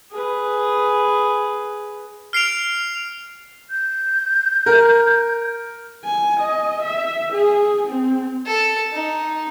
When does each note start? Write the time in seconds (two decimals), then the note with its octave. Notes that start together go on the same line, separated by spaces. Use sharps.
0.11 G#4 B4
2.33 F6 C7 D7 F7
3.70 G6
4.66 A#4
6.05 G#5
6.40 D#5
6.82 E5
7.33 G#4
7.87 C4
8.46 A4
8.93 D#4